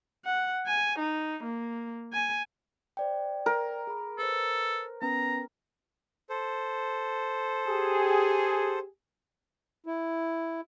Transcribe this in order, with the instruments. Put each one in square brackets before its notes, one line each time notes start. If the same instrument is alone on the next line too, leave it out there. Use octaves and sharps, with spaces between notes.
[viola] F#5
G#5
D#4
A#3
G#5
[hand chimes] C5 D5 G5
[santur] A#4
[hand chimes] G#4 B5
[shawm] A4 [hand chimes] B4 C5
[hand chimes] B3 C#4 B4 [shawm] A#5
[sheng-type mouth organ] A4 C5
[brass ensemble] G4 G#4
[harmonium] E4